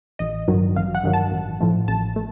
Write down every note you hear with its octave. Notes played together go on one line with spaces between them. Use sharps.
A1 D#5
G2 D#3 F#3
A1 F5
F#5
G2 D#3 F#3
A5
A1
A2 F3 A3
A1 A5
A3